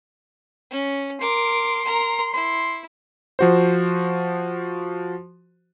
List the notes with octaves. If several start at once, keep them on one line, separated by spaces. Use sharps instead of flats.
C#4
A#4 C6 D6
A#4 A#5
E4 C6
F3 F#4 C5